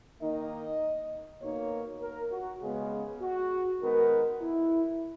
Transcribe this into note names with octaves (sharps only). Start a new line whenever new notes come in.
D#3 A#3 D#4 D#5
B2 A#3 D#4 C#5
A#4
F#4
C#3 G#3 B3 G#4
F#4
D#3 G#3 B3 D#4 A#4
E4